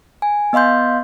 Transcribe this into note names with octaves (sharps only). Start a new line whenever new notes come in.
G#5
B3 D#5 F5 C6 G6